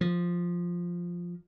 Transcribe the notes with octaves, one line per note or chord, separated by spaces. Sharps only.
F3